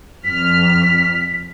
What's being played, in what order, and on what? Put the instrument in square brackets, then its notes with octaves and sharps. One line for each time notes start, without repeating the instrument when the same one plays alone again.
[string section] F2 F6 [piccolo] B6